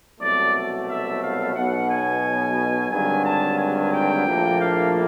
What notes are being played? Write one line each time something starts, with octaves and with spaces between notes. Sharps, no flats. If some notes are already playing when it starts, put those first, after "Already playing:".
C2 B2 F#3 A3 D5
E5
F5
B1 B2 F#3 F#5
G#5
G#1 G2 D3 F#3 G#5
A5
G#5
G5
A#1 A2 F3 A#3 D4
F5